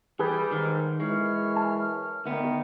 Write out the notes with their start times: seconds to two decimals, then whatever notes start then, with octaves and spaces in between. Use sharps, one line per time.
0.19 E3 G3 G#4 B4
0.51 G#2 D#3
1.00 F#2 E3 G#3 C#6 F6
1.56 G#5 A5
2.25 D2 D#3 B3